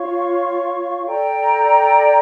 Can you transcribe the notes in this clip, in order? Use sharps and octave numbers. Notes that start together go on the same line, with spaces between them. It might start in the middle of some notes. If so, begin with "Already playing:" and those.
Already playing: F4 C#5 F5 C#6
A4 D5 G5 A#5